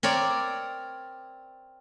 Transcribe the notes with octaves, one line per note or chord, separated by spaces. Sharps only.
C4 A#4 C#5 D5